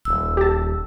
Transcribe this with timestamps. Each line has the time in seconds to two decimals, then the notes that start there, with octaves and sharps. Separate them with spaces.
0.05 D#1 E6
0.37 G4 A5